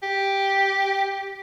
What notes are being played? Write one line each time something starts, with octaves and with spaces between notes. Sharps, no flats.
G4